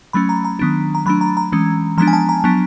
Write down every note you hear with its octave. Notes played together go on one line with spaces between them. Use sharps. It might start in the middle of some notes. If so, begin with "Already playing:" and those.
F#3 A3 C#4 B5
A#5
A#5
D#3 F#3 B3 D4
A#5
F#3 A3 D4 B5
A#5
A#5
E3 G#3 C#4
F3 G#3 B3 D4 A#5
G#5
A5
A#5
F#3 B3 D4